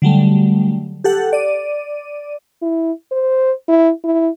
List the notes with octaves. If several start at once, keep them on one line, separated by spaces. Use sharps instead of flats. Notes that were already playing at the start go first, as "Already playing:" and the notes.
D3 F#3 G3 A3
G4 A4 F#5
D5 D#7
E4
C5
E4
E4